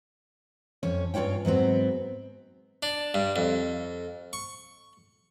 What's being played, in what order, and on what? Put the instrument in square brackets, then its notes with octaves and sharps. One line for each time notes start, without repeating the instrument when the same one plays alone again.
[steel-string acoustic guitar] F2 C#4 C#5
G2 C#4 F4 C#5 G5
G#2 F#3 B3 C4
[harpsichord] D4
G2
F2
C#6